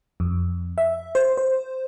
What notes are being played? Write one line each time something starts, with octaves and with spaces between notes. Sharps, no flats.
F2
E5
C5
C5